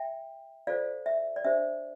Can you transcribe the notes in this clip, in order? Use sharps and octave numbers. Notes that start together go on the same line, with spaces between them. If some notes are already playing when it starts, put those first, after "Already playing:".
Already playing: E5 G5
F4 A4 C5 D5 F5
E5
D5
D4 G4 C5 E5